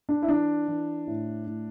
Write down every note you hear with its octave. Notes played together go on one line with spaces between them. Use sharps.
D4
E4
E3 D4
E3
A2
A2